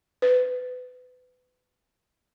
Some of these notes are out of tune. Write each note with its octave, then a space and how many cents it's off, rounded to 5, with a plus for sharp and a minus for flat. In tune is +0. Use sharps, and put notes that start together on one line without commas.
B4 +30